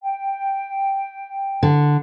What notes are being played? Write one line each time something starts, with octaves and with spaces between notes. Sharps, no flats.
G5
D3